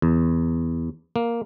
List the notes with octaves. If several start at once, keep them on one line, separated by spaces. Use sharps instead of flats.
E2
A#3